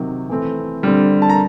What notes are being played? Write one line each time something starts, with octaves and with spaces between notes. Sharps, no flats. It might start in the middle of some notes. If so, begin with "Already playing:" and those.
Already playing: C3 D#3 F#3
E3 A3 C4
D3 G3 C4
A5
A#5